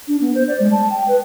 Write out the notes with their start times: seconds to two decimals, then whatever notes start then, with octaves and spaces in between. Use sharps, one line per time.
0.08 D4
0.21 B3
0.35 C5
0.48 D5
0.60 G#3
0.72 A5
0.90 G5
1.08 B4